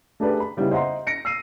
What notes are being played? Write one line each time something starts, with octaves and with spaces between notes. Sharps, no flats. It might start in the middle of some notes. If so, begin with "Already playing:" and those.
A3 D4 G4 G#4 B4 D5
B5
C#3 G3 B3 D#4 E4
C5 D#5 E5 F#5 A#5 C6
A#6 C#7 D7
E6 C7 D#7